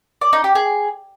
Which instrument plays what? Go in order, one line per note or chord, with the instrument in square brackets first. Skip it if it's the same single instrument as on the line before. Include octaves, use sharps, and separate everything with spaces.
[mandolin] D5
D#4
G4
G#4